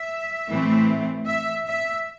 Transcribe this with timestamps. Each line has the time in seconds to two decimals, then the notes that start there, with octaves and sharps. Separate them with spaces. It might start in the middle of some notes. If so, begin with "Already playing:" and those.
Already playing: E5
0.48 A2 E3 A3 C4
1.27 E5
1.67 E5